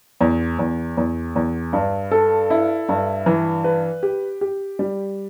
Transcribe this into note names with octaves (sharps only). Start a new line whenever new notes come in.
E2
E2
E2
E2
G2
A4
E4
G2
E3
B4
G4
G4
G3